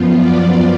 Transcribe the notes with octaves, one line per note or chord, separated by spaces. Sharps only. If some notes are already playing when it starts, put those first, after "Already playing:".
Already playing: F#2 F3 B3 F4
D5